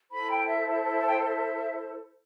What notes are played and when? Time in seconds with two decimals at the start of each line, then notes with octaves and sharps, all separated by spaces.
0.10 E4 A4 C5 B5
0.30 G5
0.48 E5
0.68 E5
1.00 A5
1.08 G5
1.15 F5
1.24 E5